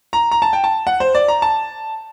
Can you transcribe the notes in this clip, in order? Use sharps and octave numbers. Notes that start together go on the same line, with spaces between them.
A#5
A#5
A5
G5
A5
F#5
C5
D5
A#5
A5